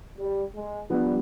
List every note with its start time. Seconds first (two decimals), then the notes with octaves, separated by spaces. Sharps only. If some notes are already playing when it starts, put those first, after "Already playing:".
0.18 G3
0.54 G#3
0.90 F3 G3 B3 D4